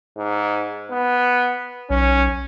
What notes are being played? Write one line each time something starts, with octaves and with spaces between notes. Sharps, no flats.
G#2
B3
B1 C#4